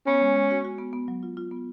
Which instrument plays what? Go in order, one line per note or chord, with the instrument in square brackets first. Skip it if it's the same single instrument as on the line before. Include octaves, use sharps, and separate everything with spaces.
[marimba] B3 [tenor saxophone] C#4
[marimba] G#3
G#3
F#4
F#4
B3
B3
F#3
F4
F4
B3